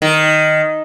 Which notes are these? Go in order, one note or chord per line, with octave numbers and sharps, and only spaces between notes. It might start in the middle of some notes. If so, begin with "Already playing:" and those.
D#3